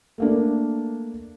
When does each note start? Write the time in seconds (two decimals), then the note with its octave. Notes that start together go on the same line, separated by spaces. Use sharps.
0.18 A3 A#3 D4